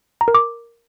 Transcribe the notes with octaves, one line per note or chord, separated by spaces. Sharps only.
A#5
A#4
D6